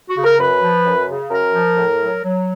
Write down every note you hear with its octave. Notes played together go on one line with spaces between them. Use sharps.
F#4
C#3
A#4
F#2 B4
F3
F#2
C#3
F#2 A#4
F3
A2
F#3
F#3